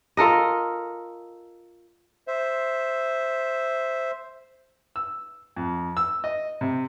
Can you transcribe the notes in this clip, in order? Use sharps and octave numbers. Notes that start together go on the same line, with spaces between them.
F4 A4 A#4 D#5
C5 E5
E6
F2
E6
D#5
C3